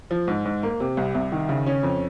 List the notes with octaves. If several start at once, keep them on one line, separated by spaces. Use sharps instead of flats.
F3
G#2
G#2
A#3
C3
C2
C2
D#3
C#3
C#4
F2